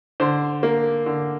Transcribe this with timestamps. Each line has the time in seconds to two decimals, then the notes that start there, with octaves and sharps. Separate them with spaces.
0.20 D3 C5
0.63 A#3
1.06 D3